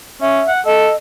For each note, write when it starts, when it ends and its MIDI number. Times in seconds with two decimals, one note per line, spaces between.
0.21 0.41 61
0.21 0.52 76
0.48 0.60 78
0.66 0.91 69
0.66 0.96 75